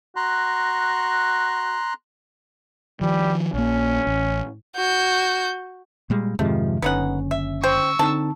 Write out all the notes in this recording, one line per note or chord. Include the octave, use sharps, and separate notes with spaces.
F#4 A#5 C6 F#6
D#3 F3 G3
A#1 A#3 C#4
A1
F#4 G6
A#2 G3 G#3
F2 G#2 C3 D#3 F3 G#3 A3
F#1 D3 B3 C#4 D#4 F#5
E5
C5 G5 C#6 E6
D3 C4 D#4 A5